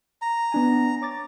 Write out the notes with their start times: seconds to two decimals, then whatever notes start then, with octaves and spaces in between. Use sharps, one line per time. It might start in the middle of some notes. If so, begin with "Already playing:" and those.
0.22 A#5
0.52 B3 D4 G#5
1.01 C#5 D6 A6